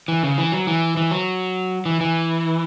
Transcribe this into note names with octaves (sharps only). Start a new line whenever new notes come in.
E3
C#3
E3
F#3
E3
E3
F#3
E3
E3